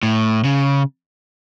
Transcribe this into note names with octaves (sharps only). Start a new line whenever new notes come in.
A2
C#3